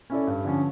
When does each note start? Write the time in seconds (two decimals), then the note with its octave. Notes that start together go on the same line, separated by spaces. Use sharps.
0.10 C#4 E4 A4 D5
0.27 G2
0.45 D3 F3 C#4